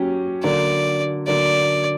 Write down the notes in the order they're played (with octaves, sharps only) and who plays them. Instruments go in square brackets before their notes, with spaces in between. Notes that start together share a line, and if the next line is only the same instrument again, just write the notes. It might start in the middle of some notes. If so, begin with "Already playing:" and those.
Already playing: [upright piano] F#3 C#4 G4
[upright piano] D3 F#3 A#3 [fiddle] D5
[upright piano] D3 F#3 A#3 [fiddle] D5